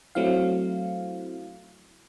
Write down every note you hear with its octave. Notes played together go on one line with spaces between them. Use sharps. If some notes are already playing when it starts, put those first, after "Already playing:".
F#3 A3 C4 E4 F5